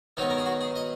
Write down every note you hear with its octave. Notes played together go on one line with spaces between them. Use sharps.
D#3 F#3 B3 D#4
A#4
G#4
F#4
G#4
D#5